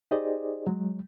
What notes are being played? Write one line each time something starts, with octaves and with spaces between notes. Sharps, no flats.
D#4 G4 G#4 C5 D5 D#5
F#3 G#3